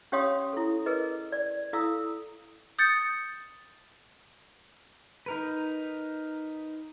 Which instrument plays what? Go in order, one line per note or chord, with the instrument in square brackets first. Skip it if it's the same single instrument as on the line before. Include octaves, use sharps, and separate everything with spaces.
[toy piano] C#4 G4 C#5 F5 C6 D#6
E4 A4
G#4 A#4 B4 D#5
D5
E4 A4 F5 A#5 D#6 E6
[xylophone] D#6 G6 A6 C#7
[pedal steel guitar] D#4 A#4 B4